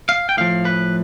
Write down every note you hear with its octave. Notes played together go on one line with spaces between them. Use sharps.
F5
G5
A2 F3 F5
B4